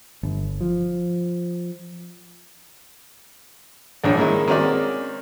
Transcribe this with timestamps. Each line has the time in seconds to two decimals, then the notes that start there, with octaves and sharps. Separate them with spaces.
0.23 G1
0.61 F3
4.04 A#1 G#2 D4 C#5
4.17 D#3 G#3 A#3 E4
4.48 D#3 G#3 C4 C#4 F#4 D5